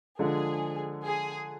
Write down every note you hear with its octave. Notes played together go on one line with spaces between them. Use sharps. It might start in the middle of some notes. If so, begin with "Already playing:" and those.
D3 F3 G#3 G#4
G#4